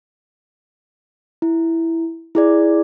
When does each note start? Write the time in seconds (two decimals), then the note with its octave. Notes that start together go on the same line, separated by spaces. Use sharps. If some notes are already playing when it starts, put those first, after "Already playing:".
1.42 E4
2.35 E4 G#4 D5